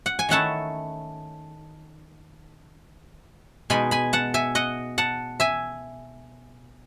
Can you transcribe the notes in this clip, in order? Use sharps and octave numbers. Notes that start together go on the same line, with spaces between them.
F#5
G#5
D#3 A3 C#4 E4 F#5 A5
B2 G#3 D#4 G#5 B5
G#5 B5
F#5 A5
E5 G#5
D#5 F#5
F#5 A5
E5 G#5